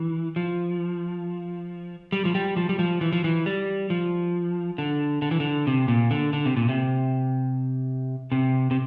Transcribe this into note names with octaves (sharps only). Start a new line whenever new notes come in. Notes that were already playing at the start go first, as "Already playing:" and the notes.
Already playing: E3
F3
G3
F3
G3
F3
G3
F3
E3
F3
E3
G3
F3
D3
D3
E3
D3
C3
A#2
D3
D3
C3
A#2
C3
C3
C3